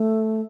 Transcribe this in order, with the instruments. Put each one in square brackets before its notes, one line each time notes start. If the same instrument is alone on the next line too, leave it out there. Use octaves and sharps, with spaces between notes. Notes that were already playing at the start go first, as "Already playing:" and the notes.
Already playing: [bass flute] A3